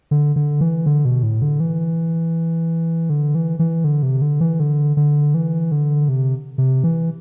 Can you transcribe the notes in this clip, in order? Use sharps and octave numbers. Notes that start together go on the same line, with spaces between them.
D3
D3
E3
D3
B2
A2
D3
E3
D3
E3
E3
D3
C3
D3
E3
D3
D3
E3
D3
C3
C3
E3